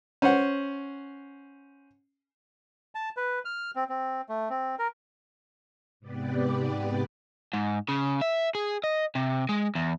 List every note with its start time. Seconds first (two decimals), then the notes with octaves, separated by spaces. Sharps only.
0.22 C#4 C5 F#5
2.95 A5
3.17 B4
3.45 F6
3.76 C4
3.89 C4
4.29 A3
4.50 C4
4.79 A#4
6.00 G#2 C3 B3 G4 B4 D5
7.53 G#2
7.89 C#3
8.21 E5
8.55 G#4
8.84 D#5
9.15 C3
9.49 G#3
9.75 E2